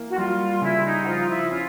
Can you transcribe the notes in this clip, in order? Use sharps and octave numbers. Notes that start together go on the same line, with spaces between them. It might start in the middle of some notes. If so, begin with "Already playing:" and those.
Already playing: E3 A#3
F#4
G3 F4
C#3 E4
D#4
F#4
F3 F4
E4
C#4 F4